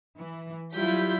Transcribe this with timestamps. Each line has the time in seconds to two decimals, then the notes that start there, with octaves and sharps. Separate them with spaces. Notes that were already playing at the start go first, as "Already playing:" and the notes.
0.18 E3
0.75 F#3 G3 E4 F4 G6 B6